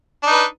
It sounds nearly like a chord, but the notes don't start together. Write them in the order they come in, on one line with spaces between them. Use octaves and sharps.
D4 D#4 B4